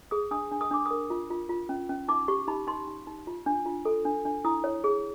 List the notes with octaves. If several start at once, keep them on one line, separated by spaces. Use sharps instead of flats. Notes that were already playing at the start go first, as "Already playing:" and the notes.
G#4 D#6
D4 D#6
D4
D#6
D4 D6
A#4 D#6
F4
F4
F4
C#4
C#4
D#4 D6
G4 C#6
D#4 B5
D#4 C6
D#4
D#4
F4
D4
F4
A4
D4
D4
E4 D#6
C#5
G#4